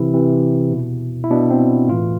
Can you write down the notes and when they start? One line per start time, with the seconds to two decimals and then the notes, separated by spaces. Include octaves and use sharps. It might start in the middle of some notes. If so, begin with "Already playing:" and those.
Already playing: C3 E3 E4
0.14 C3 E3
0.71 B2
1.24 E4
1.30 B2 D4
1.50 C4
1.89 A2 E3 F4